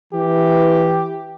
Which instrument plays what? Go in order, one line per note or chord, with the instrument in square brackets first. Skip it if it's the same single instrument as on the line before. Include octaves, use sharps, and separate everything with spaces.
[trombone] E3 [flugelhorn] G4